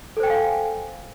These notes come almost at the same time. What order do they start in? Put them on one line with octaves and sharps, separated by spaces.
A4 C5 G5 G#5 F5